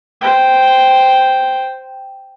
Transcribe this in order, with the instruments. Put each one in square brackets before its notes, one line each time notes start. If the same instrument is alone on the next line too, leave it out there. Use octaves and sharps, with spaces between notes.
[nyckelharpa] C5 G5